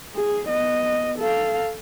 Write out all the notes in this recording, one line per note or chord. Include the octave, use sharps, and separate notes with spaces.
G#4
B3 D#5
A4 F5